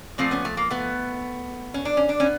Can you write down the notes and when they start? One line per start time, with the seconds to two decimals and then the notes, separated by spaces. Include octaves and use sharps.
0.18 A#2 F3 A3 C4
0.31 B3 C#4
0.45 A3
0.57 A#3
0.70 A3 B3
1.74 C#4
1.85 D4
1.97 C#4
2.09 D4
2.20 B3 C#4